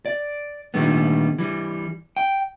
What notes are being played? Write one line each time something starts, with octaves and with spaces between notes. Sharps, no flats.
D5
A#2 D3 D#3 G3 A3 B3
E3 G3
G5